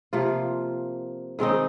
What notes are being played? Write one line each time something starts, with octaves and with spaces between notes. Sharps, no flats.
C3 F3 A#3 F4
D#3 G#3 C4 D#4